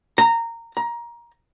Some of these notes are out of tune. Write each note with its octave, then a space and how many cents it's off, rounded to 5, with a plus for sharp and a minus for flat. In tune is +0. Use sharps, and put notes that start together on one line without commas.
A#5 -15
A#5 +20